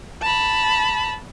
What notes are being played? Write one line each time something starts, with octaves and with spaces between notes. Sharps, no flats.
A5 B5